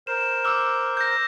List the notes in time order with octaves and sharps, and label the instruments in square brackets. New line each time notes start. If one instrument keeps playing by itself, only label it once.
[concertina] A#4 C5 [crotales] E7
[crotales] D6 E6 F6
G6 A#6